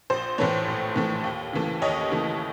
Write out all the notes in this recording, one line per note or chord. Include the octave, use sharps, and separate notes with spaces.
A#1 C5
A2 E3 A3 B4 C#5
A#1
A2 E3 A3
D#2
C#3 E3 A3
D#2 C#5 D#5
C#3 E3 A3